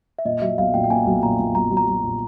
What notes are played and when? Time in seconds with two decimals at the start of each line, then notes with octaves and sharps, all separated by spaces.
0.19 E5
0.25 A#2 D#5
0.42 F#3 E5
0.58 B1 F5
0.74 A#2 G5
0.84 G5
0.90 A#3 G#5
1.06 B1
1.23 A#2 A#5
1.39 A#2
1.55 B1 A#5
1.71 F#3
1.77 A#5
1.87 F#3
2.04 A#2